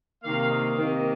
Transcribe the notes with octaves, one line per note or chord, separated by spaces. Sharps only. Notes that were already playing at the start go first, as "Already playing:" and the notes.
C3 D#3 A#3 F5
D#5
C3 D#3 A#3